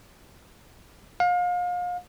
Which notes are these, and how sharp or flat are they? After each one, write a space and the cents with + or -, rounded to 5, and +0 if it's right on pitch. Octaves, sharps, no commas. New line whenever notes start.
F5 +35